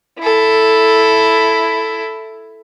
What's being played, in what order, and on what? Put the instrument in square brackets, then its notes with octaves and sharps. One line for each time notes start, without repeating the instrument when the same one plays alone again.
[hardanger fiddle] E4 A4